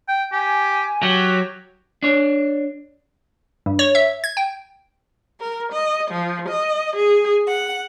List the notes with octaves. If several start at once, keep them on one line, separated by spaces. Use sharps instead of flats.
G5
G4 G#5
F#3 G4
D4 C#5
G2
C#5
E5
G#6
G5
A#4
D#5
F3
D#5
G#4
F#5